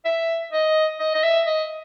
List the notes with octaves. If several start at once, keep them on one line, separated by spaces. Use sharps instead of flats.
E5
D#5
D#5
D#5
E5
D#5